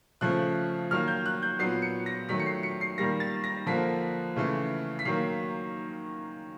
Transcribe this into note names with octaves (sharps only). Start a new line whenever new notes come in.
C#3 F3 A3 F#6
D#3 F#3 A#3 F6
G6
F#6
G6
A#2 F#3 B3 C7
C#7
A#6
D#3 F#3 A3 B6
C#7
C7
C#7
C7
D#3 G3 A#3 A#6
A6
A#6
D3 F3 A#3 B6
C#3 E3 A3
B6
D#3 F#3 A#3 C7